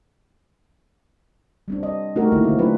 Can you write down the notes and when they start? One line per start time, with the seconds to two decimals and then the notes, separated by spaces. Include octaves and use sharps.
1.68 G3 C4 D4
1.83 D#5
2.16 A3 D#4 F#4 G4 A#4
2.32 D3 A#3 D#4 E4
2.44 D3 C4
2.59 F#3 A3 D4 F4 B4